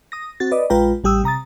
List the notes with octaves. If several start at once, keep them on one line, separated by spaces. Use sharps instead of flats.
D#6 A#6
C4 F#4 A6
B4 D5 D#5
A#1 G#3 F4 B4 G5 A#5
A1 G3 G4 D#6 E6
C3 A#5 D#6 A6